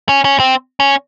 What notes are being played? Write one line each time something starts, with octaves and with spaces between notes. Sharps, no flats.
C#4
C#4
C4
C#4